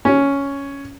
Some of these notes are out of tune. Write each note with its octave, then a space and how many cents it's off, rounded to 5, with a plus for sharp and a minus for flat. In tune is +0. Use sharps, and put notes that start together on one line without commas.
C#4 +5